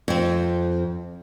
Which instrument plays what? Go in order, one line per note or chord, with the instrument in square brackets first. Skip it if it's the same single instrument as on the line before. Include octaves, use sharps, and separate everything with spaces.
[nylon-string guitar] F2 C4